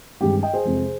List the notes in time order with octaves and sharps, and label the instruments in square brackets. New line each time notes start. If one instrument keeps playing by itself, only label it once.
[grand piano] G2 D#3 G#3 C4 G4
D#5 G5
G#4 C5
F2 C3 F3 G#3